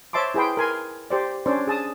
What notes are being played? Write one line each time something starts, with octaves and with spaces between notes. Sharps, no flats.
C5 C#5 E5 A5 C6 D6
E4 G#4 B4 G5 C6
A#4 G#5 C6
G4 C5 D5
C#4 D4 C5 D5
G#4 A5 D#6